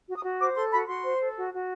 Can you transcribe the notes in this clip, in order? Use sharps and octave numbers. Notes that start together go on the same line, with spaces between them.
F#4
D#6
F#4
C5 D6
A4 C6
F#4 B5
F#4 C6
C5
A4
F#4
F#4